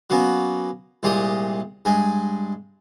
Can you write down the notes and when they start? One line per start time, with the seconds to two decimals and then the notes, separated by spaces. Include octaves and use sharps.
0.10 F#3 A#3 B3 C#4
1.03 C2 A#2 G#3 G4 D#6
1.85 G2 G#3 G#5